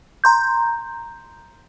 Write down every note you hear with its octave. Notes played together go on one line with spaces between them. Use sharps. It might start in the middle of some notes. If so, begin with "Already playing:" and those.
A#5 C6 G6